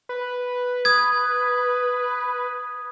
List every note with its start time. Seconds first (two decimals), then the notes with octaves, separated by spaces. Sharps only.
0.09 B4
0.85 D#6 G#6